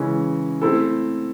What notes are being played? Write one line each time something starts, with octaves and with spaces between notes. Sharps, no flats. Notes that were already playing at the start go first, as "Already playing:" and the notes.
Already playing: C#3 E3 G#3 C#4 E4
A3 C4 E4 A4